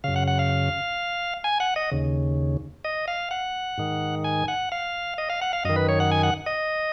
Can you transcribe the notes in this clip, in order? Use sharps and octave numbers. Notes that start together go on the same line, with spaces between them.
F#2 C#3 F5
F#5
F#5
F5
G#5
F#5
D#5
D#2 C#3
D#5
F5
F#5
G#2 D#3
G#5
F#5
F5
D#5
F5
F#5
F5
F#2 D#3 D#5
B4
C#5
F#5
G#5
F#5
D#5